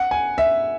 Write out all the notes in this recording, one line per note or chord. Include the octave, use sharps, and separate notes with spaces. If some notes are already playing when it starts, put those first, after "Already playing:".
Already playing: F#5
G#5
E5